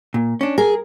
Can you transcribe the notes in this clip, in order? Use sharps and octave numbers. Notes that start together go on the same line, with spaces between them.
A#2
C#4 D4
G#4 A#4